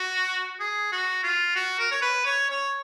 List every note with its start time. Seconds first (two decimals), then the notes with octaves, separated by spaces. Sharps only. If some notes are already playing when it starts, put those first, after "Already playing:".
Already playing: F#4
0.59 G#4
0.92 F#4
1.23 F4
1.55 F#4
1.79 A#4
1.91 C#5
2.02 B4
2.25 C#5
2.50 C#5